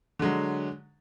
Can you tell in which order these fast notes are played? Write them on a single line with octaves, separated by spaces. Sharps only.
D3 G#3 F#3